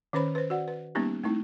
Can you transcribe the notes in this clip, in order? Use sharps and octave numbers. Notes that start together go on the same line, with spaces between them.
D#3 C#4 B4 C5 B5
B4 C5
F#4 D5 F#5
B4
G3 A#3 B3 C#4 D#4 G4
A3 C4 D#4 E4